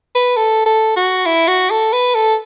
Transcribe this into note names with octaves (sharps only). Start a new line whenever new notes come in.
B4
A4
A4
F#4
E4
F#4
A4
B4
A4